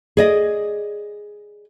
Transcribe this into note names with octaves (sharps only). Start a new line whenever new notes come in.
G#4 D5 D#5